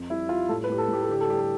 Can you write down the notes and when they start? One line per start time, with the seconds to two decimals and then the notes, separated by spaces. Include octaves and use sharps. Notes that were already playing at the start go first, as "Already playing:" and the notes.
Already playing: F2
0.10 G3 E4
0.29 G3 F4
0.49 A2 A4
0.64 B4
0.69 A2 G4
0.78 A4
0.88 A2
0.93 G4
1.03 A4
1.09 D3 G4
1.21 A4
1.28 G3 G4
1.39 A4